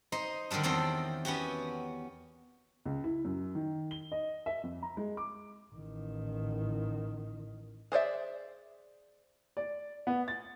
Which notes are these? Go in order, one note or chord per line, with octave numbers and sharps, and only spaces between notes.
D#4 C5 D#5
D3 D#3 F#3 G3 D4
E2 D#3 C4 D4 A4 G5
B3 C#4 F#4 G4
C#2
E4
F#2
D#3
G7
D#5
E5
F2
A#5
G#3
D6
A1 D#3
G#4 C5 D5 E5
D5
B3
A6